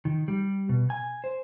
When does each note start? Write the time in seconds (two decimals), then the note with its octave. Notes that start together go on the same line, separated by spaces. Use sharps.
0.05 D#3
0.28 G3
0.69 B2
0.90 G#5
1.24 C5